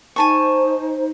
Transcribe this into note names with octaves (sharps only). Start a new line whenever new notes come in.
D#4 C5 G#5 A5 C#6